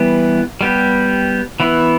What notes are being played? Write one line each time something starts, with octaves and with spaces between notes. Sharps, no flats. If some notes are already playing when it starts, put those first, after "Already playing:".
Already playing: E3 G3 B3
G3 B3 G4
E3 B3 E4